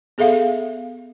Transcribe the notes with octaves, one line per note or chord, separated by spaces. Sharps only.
B3 G#4 A4 E5 F5